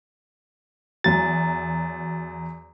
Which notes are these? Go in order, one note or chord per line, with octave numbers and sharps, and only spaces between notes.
E2 F#3 A6